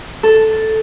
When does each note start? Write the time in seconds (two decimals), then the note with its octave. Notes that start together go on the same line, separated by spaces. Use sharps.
0.23 A4